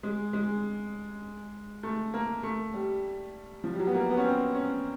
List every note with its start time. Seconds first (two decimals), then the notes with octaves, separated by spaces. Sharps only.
0.03 G#3
0.33 G#3
1.83 A3
2.14 A#3
2.43 A3
2.74 G3
3.64 F3
3.74 G3
3.79 F#3
3.87 B3
3.94 A#3
4.10 B3
4.17 C#4
4.25 C4
4.55 C#4